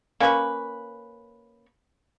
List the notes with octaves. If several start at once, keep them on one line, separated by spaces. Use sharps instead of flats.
A#3 C#4 B4 C#6